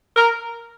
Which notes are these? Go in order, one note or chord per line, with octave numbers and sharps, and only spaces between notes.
A#4